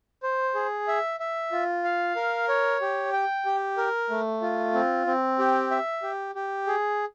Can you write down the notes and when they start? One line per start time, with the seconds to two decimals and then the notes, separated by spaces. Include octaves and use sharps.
0.23 C5
0.55 G#4
0.88 E5
1.20 E5
1.52 F4
1.84 F5
2.16 A#4
2.49 C#5
2.81 G4
3.13 G5
3.46 G4
3.78 A#4
4.10 A3
4.42 F4
4.74 C4
5.07 C4
5.39 G4
5.71 E5
6.03 G4
6.35 G4
6.67 G#4